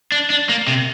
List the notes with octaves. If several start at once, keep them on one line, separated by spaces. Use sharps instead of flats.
D4
D4
A#3
C3